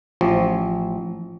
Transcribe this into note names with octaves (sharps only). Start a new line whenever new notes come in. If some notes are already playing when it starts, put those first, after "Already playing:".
A1 F3